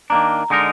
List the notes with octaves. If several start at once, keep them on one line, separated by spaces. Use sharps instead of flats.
D#3 A#3 D4 A#5
D3 G#3 D#4 A#4